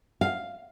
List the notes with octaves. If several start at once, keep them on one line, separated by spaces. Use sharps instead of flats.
F5